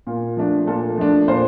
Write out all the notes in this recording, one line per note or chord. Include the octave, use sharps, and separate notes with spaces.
A#2
F3 A3 D4
A#2 A4
F3 A3 D4
A#2 C5